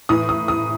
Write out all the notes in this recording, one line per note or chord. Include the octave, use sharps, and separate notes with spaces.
A2 E3 D#6
D#6
D#6